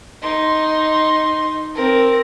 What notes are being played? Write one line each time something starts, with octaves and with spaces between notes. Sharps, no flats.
D#4 C6
C4 A#4